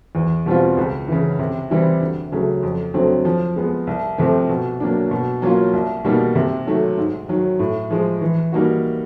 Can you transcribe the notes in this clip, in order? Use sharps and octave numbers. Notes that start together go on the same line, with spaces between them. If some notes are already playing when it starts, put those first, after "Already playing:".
E2
B2 G3 C4 F4
C#2
C#3 E3
C3
E3 G3 C4 E4
D2
C#3 F#3 A3
F2
D3 F#3 A3 C4
F3
G#3 B3
C2
C3 F3 A3 C4
B2
F#3 A#3 D4
B2
F#3 A#3 C#4 F4
C2
B2 G3 A#3 D#4
C3
D#3 F#3 A3
G#2
D#3 F#3
A2
F3 G#3
E3
G3 A#3 D#4 F#4